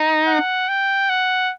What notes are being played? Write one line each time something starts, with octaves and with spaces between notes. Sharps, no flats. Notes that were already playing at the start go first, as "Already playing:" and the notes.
Already playing: D#4
F#5
G5
F#5